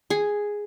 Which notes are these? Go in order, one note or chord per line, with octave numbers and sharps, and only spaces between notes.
G#4